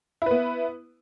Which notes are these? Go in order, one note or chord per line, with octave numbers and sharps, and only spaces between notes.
B3 E4 B4